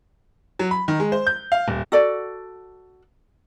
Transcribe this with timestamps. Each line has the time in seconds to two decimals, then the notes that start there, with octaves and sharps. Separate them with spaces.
0.59 F#3
0.71 B5
0.88 D#3
1.00 G#3
1.12 C5
1.27 G6
1.52 F5
1.68 D#1
1.92 F#4 A4 D5